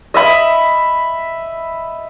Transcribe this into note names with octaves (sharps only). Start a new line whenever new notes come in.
D#5 E5 B5